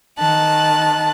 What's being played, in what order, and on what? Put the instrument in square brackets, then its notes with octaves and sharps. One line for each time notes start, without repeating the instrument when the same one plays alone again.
[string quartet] D#3 A5 F#6